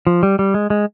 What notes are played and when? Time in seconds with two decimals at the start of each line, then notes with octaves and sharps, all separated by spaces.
0.07 F3
0.23 G3
0.39 G3
0.54 G#3
0.70 G#3